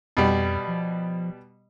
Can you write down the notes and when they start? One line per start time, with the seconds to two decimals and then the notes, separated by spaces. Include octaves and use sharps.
0.17 F2 B2 G3
0.68 F3